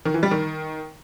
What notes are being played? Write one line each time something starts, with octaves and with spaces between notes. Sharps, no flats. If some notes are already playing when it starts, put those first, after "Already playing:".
D#3
E3
G3
D#3